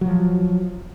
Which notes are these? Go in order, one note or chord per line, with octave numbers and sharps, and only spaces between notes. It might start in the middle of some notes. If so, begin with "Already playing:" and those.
F3 F#3